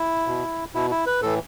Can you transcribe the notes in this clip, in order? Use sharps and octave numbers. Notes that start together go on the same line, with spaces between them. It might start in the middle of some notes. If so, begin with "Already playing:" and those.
Already playing: E4
B2
B2 E4
E4
B4
A2 E3 A4